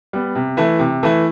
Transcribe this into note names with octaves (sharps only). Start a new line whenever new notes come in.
G3 B3
C3
E3 A3 E4
C3
E3 A3 E4